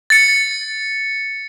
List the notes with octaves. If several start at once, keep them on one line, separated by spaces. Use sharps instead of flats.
A6 C#7